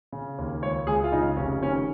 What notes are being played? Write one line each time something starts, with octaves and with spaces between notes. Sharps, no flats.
C#3
D#2
C#2 C#5
C#2 G#4
F4
C#3 D#4
F1 C#4
D#3 C#4